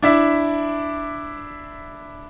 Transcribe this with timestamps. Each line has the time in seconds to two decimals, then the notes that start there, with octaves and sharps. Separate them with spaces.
0.03 D4 E4 E5